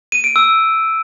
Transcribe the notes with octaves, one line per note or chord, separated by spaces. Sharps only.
D#7
D7
E6